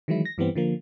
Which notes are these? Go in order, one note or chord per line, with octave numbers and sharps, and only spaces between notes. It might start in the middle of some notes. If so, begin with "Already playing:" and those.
D#3 E3 F#3 G#3 E4
A#6
G2 E3 G3 B3 C4
D3 F3 A#3